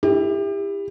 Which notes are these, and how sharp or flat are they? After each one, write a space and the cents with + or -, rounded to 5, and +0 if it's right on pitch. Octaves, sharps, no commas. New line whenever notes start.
E4 +0 G4 +30